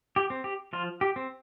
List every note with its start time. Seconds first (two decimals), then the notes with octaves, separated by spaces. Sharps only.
0.16 G4
0.30 C4
0.44 G4
0.73 F3 F4
1.01 G4
1.16 C4